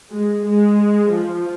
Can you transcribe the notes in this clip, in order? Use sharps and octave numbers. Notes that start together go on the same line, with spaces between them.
G#3
G#3
F3